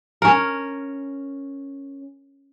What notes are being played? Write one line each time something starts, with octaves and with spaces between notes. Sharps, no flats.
C#4 A#4